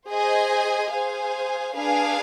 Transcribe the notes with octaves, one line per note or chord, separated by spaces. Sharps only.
G#4 C5 D#5 G#5
G#4 C5 F5 G#5
D4 G#4 B4 F5 G#5